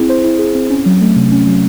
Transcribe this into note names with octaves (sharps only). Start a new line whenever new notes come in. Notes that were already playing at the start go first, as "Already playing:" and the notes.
Already playing: C4 E4 G#4
C5
E4
G#4
C4
C#4
F#3
A3
C3
C#4
F#3